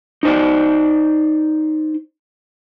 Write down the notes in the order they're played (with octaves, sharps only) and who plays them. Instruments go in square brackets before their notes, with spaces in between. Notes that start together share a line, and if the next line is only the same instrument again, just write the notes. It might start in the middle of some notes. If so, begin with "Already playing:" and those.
[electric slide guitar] D#4 C5 D5